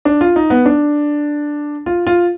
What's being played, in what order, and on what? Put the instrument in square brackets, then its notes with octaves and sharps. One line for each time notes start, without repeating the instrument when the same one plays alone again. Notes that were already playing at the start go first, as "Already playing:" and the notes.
[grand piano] D4
F4
D#4
B3
D4
F4
F4